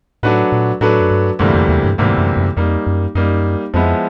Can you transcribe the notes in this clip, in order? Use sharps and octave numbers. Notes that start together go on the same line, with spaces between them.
A2 F#3 A3 D4 F#4 B4
A#2
A2 F#3 A3 D4 F#4 B4
F#2
G2
D2 G2 C3 E3 G3 A#3
F2
E2
G2
D2 G#2 C3 E3 G3 A#3
F#2
F#2
F2 G3 A#3 D#4
F#2
F#2 G3 A#3 D#4
F2 F3 G#3 B3 E4